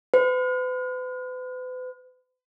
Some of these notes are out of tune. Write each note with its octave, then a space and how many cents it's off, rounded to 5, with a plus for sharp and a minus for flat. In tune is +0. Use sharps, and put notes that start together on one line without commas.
B4 +45